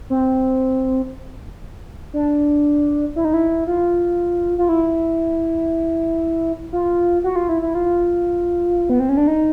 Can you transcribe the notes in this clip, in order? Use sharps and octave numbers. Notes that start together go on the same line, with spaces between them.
C4
D4
E4
D#4
E4
F4
F4
E4
F4
F#4
F4
E4
E4
F4
B3
C4
C#4
D4
D#4